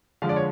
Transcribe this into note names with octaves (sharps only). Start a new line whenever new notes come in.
D3 F3 G#3 F5
D5
C#5